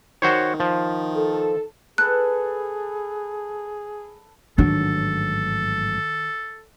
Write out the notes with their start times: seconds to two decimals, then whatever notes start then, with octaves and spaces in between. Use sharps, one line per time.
0.22 D#3 F#4 C5 C#5
0.60 F3
1.15 A4
1.98 G#4 A4 B4 F#6
4.58 A1 G#2 D#3 F#3 D4 A4